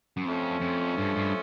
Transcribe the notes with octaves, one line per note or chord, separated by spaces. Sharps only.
F#2
F2 F3 A3 C#4
F2
G2
G2